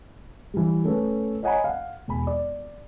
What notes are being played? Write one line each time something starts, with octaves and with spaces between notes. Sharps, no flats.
E3 G3
A3 C#4 A4 B4
C#5 D#5 F#5 G#5 A#5 B5
F5 F#5
E1 G#5 B5
D5